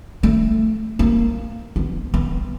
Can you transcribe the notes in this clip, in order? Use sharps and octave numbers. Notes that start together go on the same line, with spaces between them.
A3
A#3
B3
B3